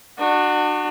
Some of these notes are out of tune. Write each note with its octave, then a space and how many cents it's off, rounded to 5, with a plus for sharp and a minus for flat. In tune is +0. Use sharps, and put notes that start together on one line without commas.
D4 +35 F#4 +0